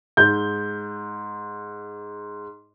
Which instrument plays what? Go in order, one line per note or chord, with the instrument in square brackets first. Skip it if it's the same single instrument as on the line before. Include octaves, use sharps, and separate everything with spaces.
[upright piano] G#2 G6